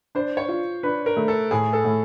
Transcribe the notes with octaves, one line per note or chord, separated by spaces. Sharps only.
D4 C5
C#5
F4
D4 B4
A#4
A3
A4
A2 G#4
A4
A2